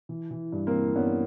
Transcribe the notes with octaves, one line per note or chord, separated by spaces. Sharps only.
E3
E3
G2
A#3 C4
E3
G2 B3 C#4